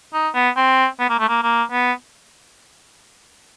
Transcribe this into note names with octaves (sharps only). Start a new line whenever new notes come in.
D#4
B3
C4
B3
A#3
A3
A#3
A#3
B3